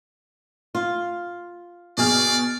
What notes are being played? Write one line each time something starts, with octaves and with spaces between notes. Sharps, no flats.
F4
B2 G#4 D5 F6